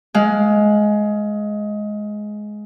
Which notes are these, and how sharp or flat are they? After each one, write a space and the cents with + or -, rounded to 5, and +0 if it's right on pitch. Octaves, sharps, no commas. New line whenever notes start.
G#3 +15 F5 +0